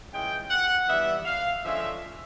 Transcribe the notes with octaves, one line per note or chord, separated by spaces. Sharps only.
E3 G#3 C#4 F4 G5
F#5
E3 G3 B3 D4 E5
F5
D3 F3 G#3 C#4 F4 E5